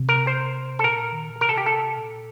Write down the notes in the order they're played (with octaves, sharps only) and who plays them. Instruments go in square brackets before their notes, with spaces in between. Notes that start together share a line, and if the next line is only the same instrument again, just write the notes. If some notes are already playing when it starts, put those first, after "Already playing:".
Already playing: [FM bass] C3
[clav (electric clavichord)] A#4
C5
A4
[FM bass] A#2 [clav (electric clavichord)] A#4
[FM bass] D#3
A#2
[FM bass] C3 [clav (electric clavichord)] A#4
[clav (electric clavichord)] A4
G4
A4
[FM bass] A#2